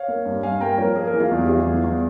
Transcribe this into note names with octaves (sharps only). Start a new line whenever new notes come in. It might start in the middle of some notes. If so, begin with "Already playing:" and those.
Already playing: C#5 F5
A#3
G2
G2 F5 G#5
A#3 G5 A#5
F3 A#4 C#5
A#3 G#4
A#4
E3
F4 G#4
E2
G4
E3 F4 G#4
E2
E2